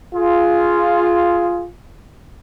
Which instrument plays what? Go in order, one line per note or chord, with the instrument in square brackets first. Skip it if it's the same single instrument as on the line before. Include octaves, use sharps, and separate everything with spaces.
[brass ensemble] F4 G#4